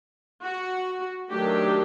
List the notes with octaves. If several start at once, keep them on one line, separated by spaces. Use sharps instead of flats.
F#4
D#3 F#3 A3 D4 G4